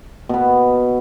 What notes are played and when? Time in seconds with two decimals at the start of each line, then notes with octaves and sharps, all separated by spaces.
0.29 B2 B3